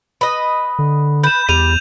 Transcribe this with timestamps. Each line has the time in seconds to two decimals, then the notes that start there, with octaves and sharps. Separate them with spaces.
0.21 B4 D#5
0.79 D3
1.23 B4 G6 E7
1.49 E2 G3 D#7 F7